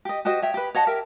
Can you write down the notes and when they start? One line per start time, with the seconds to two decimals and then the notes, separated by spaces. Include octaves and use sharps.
0.05 G4 D#5
0.25 F#4 G4 C5 D#5
0.42 C#5 E5 G5
0.54 G4 B4
0.75 C#5 D#5 F#5 A5
0.87 G4 A#4 E5